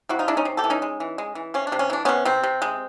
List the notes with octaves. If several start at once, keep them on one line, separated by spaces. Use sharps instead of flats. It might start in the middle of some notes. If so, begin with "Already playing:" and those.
C3 E4 F#4
D#4 F4
G#3 D4 E4
C#4 D#4
C3
G4 A4
E3
C#4 D#4
G#3
E3
G#3
E3
C3 C#4
D4
C3
C#4
E3 D4
C3 B3 C#4
C3 C4
C3
G#3